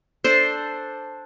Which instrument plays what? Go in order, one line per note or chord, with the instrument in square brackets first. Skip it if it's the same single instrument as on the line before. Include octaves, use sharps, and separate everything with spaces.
[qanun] D4 A4 C5